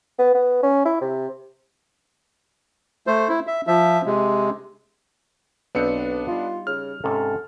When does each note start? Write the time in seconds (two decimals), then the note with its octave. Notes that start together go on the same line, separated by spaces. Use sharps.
0.19 B3
0.35 B3
0.63 C#4
0.86 E4
1.01 C3
3.07 A3 C5
3.29 E4
3.47 E5
3.67 F3 E5
4.06 C3 G#3
5.75 B1 B3 C4 D4 B4 C#7
6.28 G3 D#4 F4 F5
6.67 C#3 F6
7.04 G#2 C3 C#4 A4